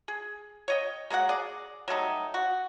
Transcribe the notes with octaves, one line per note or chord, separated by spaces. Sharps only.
G#4
C#5 D#5 G5
G#3 A#3 F#4 F#5
G#4 D5
F#3 G3 A3 D#4
F#4